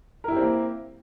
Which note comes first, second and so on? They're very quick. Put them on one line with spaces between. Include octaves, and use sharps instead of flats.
A#4 E4 G4 C4 A#3